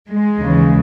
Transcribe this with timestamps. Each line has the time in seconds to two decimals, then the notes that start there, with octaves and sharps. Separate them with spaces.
0.08 G#3
0.38 D#2 C#3 E3